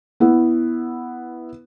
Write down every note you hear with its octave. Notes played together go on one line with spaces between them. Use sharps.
B3 E4